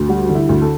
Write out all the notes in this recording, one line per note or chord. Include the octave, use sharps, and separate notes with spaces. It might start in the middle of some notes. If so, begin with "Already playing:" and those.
Already playing: D2
G3 F#4
D3
E4
D2
A4